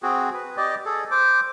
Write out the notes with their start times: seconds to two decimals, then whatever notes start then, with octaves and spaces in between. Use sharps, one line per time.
0.03 C4 F#4 G#4
0.34 B4
0.57 G4 D5 D#5
0.86 G#4 A4
1.11 C5 D6